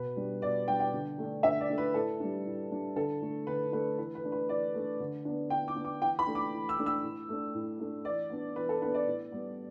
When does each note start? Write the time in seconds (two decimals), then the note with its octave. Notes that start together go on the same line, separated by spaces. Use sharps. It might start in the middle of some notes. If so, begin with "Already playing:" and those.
Already playing: B2 B4
0.16 G3 D4
0.42 B2 D5
0.67 G3 D4 G5
0.80 G5
0.93 D3
1.18 A3 D4
1.43 D3 E5
1.60 D5
1.70 A3 D4
1.78 B4
1.94 A2 A4
2.20 G3 D4
2.46 A2
2.71 G3 D4
2.96 D3 A4
3.22 A3 D4
3.47 D3 B4
3.72 A3 D4 B4
3.98 E3 B4
4.15 B4
4.23 A3 D4
4.32 B4
4.49 E3 D5
4.74 A3 D4
5.00 D3
5.25 B3 D4
5.50 D3 G5
5.68 D6
5.76 B3 D4
5.85 D6
6.02 E3 G5
6.19 B5
6.27 A3 D4
6.35 D6
6.53 E3
6.69 E6
6.78 A3 D4
6.86 E6
7.04 A2
7.29 A3 D4
7.54 A2
7.80 A3 D4
8.05 E3 D5
8.30 B3 D4
8.56 E3 B4
8.69 A4
8.82 B3 D4 B4
8.94 D5
9.07 A2
9.32 G3 B3